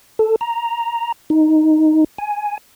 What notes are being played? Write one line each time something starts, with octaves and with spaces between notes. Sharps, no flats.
A4
A#5
D#4
G#5